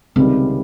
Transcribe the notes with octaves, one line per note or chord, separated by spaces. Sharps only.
C#2 C3 D#3 G3 C4